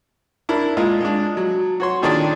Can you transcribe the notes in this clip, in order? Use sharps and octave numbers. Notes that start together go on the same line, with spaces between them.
D4 E4 A#4
A#2 G#3 F4
G#3 D4
F#3
F#4 C#5 C6
A#2 D#3 D4 G#4 D5 G5